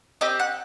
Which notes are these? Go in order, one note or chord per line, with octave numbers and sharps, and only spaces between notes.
C4 G4 D#5
F#5